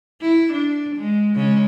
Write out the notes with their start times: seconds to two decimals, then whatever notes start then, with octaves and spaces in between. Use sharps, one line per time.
0.21 E4
0.52 D4
0.96 G#3
1.35 C#3 G#3 C#4